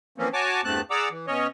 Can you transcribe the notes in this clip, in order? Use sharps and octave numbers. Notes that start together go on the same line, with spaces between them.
E3 F3 A#3 C4 C#4
F#4 C#5 G#5 A5 D6
E2 G2 A3 C4 A5 F#6
G#4 D5 F#5 A#5 D6 E6
E3
B2 C#4 C#5 D#5